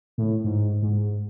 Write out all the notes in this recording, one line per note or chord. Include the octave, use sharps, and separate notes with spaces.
A2
G#2
G#2